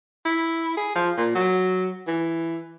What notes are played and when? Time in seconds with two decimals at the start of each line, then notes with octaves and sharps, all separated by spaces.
0.25 E4
0.77 G#4
0.95 F3
1.17 A#2
1.35 F#3
2.07 E3